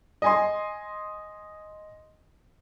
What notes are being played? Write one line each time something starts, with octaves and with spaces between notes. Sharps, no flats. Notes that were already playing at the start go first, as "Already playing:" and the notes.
D#5 G#5 C6